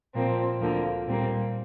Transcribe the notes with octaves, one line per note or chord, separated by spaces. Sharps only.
A#2 F3 A#3 C4
D2 D3 F3 A#3
A#2 G3 A#3 C4